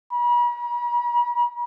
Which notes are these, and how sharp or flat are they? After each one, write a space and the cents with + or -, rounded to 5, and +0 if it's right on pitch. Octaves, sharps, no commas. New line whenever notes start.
B5 -45